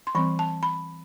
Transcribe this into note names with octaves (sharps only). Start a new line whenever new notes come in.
C6
E3 G3 C4 B5
A5
B5